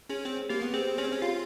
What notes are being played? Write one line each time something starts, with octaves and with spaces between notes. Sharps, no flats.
C#4 G#4
C4 G#4
A#3 G4
B3
C4 G#4
C#4 G#4
C4
C#4
F4 G4